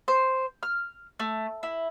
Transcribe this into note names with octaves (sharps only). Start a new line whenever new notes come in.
C5
F6
A3
E4